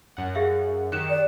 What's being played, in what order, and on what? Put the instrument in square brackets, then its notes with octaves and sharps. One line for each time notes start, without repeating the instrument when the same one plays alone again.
[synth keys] F#2 F#5
[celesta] G#4 E5 F5
[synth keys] D#3 G4 C#7 [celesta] F#6 E7
[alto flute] D5